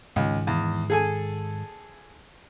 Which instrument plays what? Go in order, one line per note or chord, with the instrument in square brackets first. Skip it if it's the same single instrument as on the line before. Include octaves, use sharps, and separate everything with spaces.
[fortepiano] C#2 [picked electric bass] G#2 D#3
[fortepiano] E2
G#4 A4 G#5